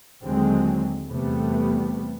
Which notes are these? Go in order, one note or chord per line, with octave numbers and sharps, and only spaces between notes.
D#2 D3 F#3 G#3 C4
E2 C3 G3 A3 B3